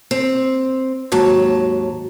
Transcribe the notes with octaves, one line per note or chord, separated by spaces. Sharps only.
C4
D#2 G#2 F#3 A5